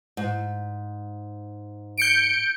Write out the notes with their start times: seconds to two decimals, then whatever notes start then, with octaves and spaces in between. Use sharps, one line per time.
0.17 G#2
1.98 G6 C#7 D7